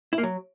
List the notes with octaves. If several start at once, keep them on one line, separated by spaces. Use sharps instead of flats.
E4
A#3
F#3